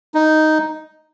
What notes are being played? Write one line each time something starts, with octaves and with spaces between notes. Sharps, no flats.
D#4